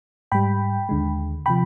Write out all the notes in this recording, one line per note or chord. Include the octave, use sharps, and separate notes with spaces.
G#2 G3 G5 B5
D#2 D3 G#3
C3 F3 G5 B5